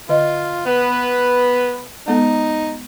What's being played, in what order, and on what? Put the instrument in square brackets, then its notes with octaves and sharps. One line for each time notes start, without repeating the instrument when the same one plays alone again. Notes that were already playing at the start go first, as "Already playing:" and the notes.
[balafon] D3 D#5 [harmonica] F4
[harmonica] B3 B4
[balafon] G#3 B3 A4 [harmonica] D#4